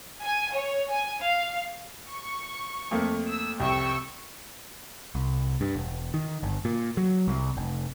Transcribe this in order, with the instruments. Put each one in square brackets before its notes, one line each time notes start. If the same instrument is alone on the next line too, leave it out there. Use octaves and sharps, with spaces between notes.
[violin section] G#5
C#5
G#5
F5
C#6
[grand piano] F2 A3 A#3
[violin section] E6
[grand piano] C2 F2 C3 [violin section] G5 C#6 E6
[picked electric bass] C2
G2
E1
D#3
G1
A#2
F#3
C2
F1